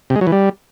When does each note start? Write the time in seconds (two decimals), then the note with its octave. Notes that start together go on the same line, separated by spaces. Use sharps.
0.10 C3
0.16 G#3
0.21 F#3
0.27 E3
0.32 G3